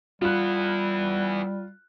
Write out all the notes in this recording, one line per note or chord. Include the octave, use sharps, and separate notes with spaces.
G3 B3 E4 F4 F#6